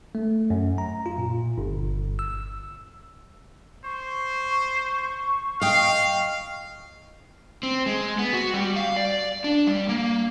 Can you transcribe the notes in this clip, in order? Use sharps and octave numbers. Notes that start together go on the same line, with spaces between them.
A3
F#2
A#5
F4
A#2
G1
E6
C5 C#6
D#5 F5 G5
C4
G#3
B3
F#4
G3
F5
D5
D4
G3
A#3